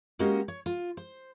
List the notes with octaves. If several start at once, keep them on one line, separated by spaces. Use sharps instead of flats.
G#3 A#3 C#4 F#4 G4 D#5
C#5
F4
C5